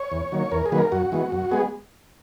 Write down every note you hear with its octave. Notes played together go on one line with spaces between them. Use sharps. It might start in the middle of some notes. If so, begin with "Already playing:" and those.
Already playing: C#5
E2
D#3 F#3 A#3
E2 A#4
G#4
D#3 F#3 A#3 B4
A#4
F#2 F#4
E3 G#3 B3
F#2
G#3 B3 G#4